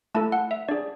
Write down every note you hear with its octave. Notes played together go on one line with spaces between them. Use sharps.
A3 E4 A4 A5
F#5
E5
D4 G#4 D5